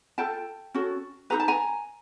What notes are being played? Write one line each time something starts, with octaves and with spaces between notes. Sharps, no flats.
F4 A4 G5 A5
C#4 F#4 A4
D#4 G#4 B4 A#5
A5
G#5 A#5